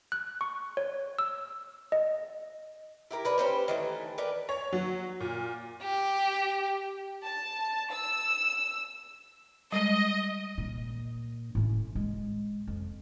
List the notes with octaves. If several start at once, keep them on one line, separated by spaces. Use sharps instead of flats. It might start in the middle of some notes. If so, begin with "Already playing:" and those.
F#6
C#6
C#5
E6
D#5
E4 G4 A#4
A#4 B4 D5
C#4 G4 C5
D#3 E3 A3
A#4 B4 D5 G5
C#5
F#3
A#2
G4
A5
E6
G3 G#3 D#5
A#2
A2 C#4
G#3
F2